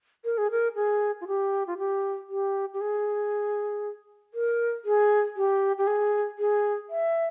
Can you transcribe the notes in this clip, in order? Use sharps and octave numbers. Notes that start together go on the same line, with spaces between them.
A#4
G#4
A#4
G#4
F4
G4
F4
G4
G4
G4
G#4
A#4
G#4
G4
G4
G#4
G#4
E5